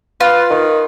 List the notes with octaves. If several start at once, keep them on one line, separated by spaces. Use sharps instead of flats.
F4 B4
D#3